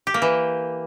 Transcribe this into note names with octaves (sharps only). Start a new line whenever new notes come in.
G4
A#3
E3